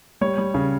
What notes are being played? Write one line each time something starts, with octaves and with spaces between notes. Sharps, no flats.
G3 C#5
G3
C#3